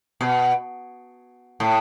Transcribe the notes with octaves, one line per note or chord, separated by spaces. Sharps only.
B2
A2